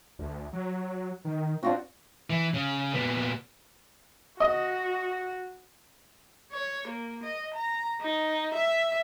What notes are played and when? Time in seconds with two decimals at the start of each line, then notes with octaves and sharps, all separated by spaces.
0.19 D2
0.53 F#3
1.25 D#3
1.63 C4 D4 F4 F#4
2.30 E3
2.54 C#3
2.94 A#2 B3
4.40 F#4 D#5
6.52 C#5
6.87 A#3
7.23 D#5
7.54 A#5
8.01 D#4
8.54 E5